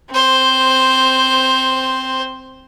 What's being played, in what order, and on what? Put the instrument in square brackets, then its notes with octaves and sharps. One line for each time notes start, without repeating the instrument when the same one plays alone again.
[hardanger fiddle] C4 C5